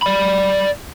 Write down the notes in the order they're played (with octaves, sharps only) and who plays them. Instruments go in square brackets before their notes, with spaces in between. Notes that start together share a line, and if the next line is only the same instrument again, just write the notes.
[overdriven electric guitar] D5 B5